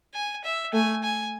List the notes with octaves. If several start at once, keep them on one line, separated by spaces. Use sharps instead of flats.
G#5
E5
A3 G#5
G#5